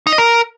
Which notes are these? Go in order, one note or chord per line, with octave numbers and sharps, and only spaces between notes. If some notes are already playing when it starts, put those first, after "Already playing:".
D#4
D#5
A#4